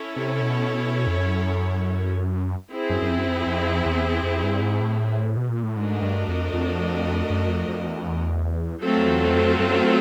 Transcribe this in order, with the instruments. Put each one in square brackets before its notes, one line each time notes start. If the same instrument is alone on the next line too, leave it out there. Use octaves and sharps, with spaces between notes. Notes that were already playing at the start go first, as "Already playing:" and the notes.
Already playing: [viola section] C#4 E4 A4 C#5
[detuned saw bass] C3
B2
F2
F#2
[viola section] C4 E4 G#4
[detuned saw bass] F#2
F#2
F2
F#2
F2
F2
E2
F2
G2
G#2
A2
B2
A#2
A2
[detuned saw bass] G#2 [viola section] A3 D4 F#4 A#4 D#5
[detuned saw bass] G2
F2
F2
F#2
F2
F2
E2
F2
E2
[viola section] F#3 A3 C4 F4 A4
[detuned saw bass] F2
E2
F2
F#2